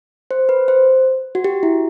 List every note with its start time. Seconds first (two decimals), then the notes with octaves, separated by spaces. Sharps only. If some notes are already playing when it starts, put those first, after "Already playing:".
0.31 C5
0.49 B4
0.68 C5
1.35 F#4
1.44 G4
1.63 E4